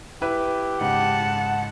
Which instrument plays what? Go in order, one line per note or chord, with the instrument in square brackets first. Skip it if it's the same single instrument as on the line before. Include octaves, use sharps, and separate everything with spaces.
[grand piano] E4 B4 [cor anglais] G4
[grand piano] G#2 C#3 [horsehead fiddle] F#5 A5